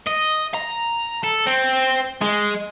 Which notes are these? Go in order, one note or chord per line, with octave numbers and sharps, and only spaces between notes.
D#5
A#5
A4
C4
G#3